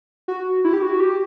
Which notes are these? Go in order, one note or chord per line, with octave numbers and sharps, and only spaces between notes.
F#4
E4
G4
F#4
G4